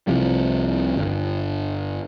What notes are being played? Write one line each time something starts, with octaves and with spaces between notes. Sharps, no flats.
C2 C3 F3 G3
G1